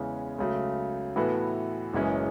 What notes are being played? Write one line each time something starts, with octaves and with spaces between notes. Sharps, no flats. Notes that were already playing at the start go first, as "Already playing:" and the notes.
Already playing: E2 C#3 E3 G#3 C#4
C#2 C#3 F#3 A3
A2 E3 B3 F#4 A4
F#1 F#2 E3 G#3 C#4